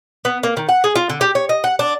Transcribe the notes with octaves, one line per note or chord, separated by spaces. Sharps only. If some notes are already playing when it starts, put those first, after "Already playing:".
B3
A#3
D#3
F#5
G#4
F4
D3
G4
C#5
D#5
F#5
D4